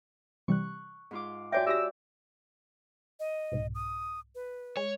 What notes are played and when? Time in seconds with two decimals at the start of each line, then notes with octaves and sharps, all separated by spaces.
0.48 C3 E3 G3 C#6 F#6
1.11 G#2 F4 D6
1.52 F#4 C#5 D5 E5 G5 G#5 D6
1.67 F#4 G4 D5 E5 D#6 E6 A#6
3.20 D#5
3.52 C2 G#2 B2
3.75 D#6
4.35 B4
4.77 G#3 C#5